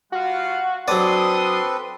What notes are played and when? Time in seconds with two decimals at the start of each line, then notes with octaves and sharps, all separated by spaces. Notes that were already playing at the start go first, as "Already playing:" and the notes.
0.12 G3 F4 F#4 F5
0.88 F#3 C4 D4 A4 B4 D5 C6 D#6